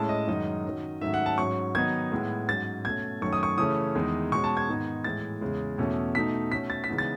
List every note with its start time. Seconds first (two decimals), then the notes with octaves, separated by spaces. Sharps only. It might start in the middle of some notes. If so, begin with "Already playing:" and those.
Already playing: A2 G#3 C#4 A5
0.09 D#5
0.27 F#2 D#3 G#3 D#4 D#5
0.65 D#3 F#3 C#4
1.01 G#2 D#3 F#3 A3 C#4 E5
1.14 F#5
1.26 A5
1.38 G#2 F#3 C#4 C#6
1.75 D#3 F#3 B3 D#4 G#6
2.12 A2 G#3 B3
2.48 G#2 F#3 C#4 A6
2.85 B2 A3 C#4 G#6
3.22 F#2 D#3 A3 C#4 C#6
3.33 D#6
3.43 C#6
3.58 C#3 E3 A3 C#4 D#6
3.95 E2 D#3 G#3 D#4
4.31 B2 G#3 C#4 C#6
4.44 A5
4.57 G#6
4.69 G#2 D#3 G#3 B3 D#4
5.04 A2 E3 G#3 A6
5.41 E2 C#3 G#3
5.78 E2 B2 A3 C#4
6.15 B2 A3 D#4 B6
6.51 B2 A3 C#4 B6
6.70 A6
6.84 B6
6.89 C#3 E3 G#3 B3 D#4
6.98 A6